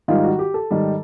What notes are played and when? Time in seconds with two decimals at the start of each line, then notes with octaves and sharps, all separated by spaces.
0.08 G#2 D#3 G3 F4
0.24 F#4
0.39 G4
0.54 A4
0.71 G#2 D#3 G3